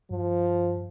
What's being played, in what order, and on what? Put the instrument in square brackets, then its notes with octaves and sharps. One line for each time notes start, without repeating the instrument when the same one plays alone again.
[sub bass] G2 [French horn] F3